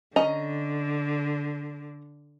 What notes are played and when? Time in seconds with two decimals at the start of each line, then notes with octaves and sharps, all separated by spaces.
0.16 D3 C#4 D#5 A#5